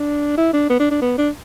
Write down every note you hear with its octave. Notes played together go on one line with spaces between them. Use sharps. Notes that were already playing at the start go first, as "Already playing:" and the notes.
Already playing: D4
E4
D4
B3
D4
D4
B3
D4